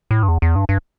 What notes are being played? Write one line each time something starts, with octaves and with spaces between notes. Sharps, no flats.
A2
G2
E2
E2
G2
G2